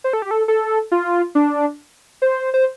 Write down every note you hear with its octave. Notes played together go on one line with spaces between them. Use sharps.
C5
A4
G4
A4
A4
F4
D4
C5
C5